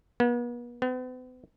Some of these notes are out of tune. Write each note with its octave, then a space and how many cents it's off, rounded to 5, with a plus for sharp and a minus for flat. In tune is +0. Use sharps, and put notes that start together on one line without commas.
B3 -40
B3 +45